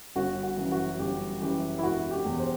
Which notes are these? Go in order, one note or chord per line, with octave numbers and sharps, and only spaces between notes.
G1 F#4
F#4
F#2 E3
F#4
G1 G4
F#2 E3 G4
E4
E1 F#4
G4
E2 B2
C5